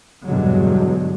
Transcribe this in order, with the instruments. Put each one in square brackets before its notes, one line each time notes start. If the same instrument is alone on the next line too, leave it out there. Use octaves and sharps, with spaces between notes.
[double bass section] E2 G2 B2 D3 F#3 G#3